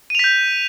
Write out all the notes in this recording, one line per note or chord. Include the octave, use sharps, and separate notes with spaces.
G6 B6 D#7 F7